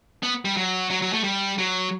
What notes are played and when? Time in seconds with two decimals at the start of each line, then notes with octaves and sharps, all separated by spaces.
0.23 B3
0.45 G3
0.57 F#3
0.90 F#3
1.02 F#3
1.13 A3
1.24 G3
1.58 F#3